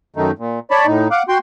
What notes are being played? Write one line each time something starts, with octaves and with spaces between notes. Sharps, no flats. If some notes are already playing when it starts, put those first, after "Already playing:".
F#2 D#3 A3 D#4
A#2
C#5 D5 A5 B5
A2 D#4
F5 F#5 D6
F#4 G5 C6